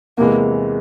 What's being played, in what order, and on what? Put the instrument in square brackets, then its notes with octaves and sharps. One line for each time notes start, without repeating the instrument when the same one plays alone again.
[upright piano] E2 C3 E3 G#3 [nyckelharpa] A#3